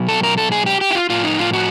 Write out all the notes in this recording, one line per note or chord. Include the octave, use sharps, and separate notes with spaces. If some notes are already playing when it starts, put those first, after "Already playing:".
Already playing: B2 F#3
A4
A#4
A4
G#4
G4
G4
E4
F4
A2 F3 F4
D#4
F4
F#4